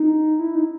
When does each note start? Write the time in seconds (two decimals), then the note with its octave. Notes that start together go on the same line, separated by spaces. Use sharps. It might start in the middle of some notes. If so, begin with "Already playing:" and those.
Already playing: D#4
0.39 E4
0.55 D#4